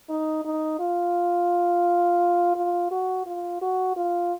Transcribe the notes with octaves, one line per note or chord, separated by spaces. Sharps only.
D#4
D#4
F4
F4
F#4
F4
F#4
F4